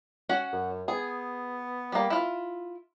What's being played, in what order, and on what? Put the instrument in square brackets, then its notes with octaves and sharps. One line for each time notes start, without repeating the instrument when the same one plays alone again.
[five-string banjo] C#4 F#4 F#5
[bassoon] F#2
[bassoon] B3 [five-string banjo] G#4
[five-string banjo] G3 A#3
E4 F4